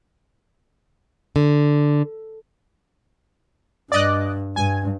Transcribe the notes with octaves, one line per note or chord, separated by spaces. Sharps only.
D3
G2 D5 D#5 F#6
G2 G#5